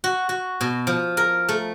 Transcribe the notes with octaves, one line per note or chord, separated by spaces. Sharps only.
F#4
F#4
B2
F3
A#4
A3